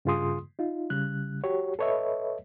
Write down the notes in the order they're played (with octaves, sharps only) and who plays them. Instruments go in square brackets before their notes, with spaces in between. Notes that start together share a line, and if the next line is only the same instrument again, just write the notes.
[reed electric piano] G2 C#3 F4 G#4 C6 D#6
D#4 F4
C#3 G3 F#6
F#4 G4 C#5
A4 B4 C#5 D#5 E5